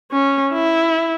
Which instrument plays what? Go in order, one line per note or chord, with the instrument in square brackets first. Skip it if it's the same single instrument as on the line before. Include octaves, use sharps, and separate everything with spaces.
[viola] C#4
E4